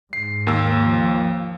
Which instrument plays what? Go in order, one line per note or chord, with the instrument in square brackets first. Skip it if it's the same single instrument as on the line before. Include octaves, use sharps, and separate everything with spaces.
[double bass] G#2 [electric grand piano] C7
[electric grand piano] D#2 A#3 E6
[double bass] F3